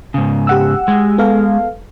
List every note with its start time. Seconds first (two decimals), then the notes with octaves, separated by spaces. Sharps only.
0.14 G#2 C#3
0.47 G4 F#5 E6
0.88 G#3
1.18 B3 A4 F5